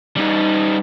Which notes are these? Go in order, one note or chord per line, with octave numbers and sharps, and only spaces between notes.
G3 D#4